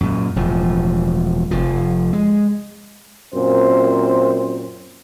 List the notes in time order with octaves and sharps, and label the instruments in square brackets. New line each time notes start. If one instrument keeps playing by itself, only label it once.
[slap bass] F#2 A#2
E1 A2 F3
F1 F3
G#3
[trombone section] F#2 A#2 C4 C5